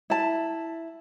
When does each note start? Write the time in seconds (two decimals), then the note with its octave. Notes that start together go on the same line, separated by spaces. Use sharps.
0.10 E4 A5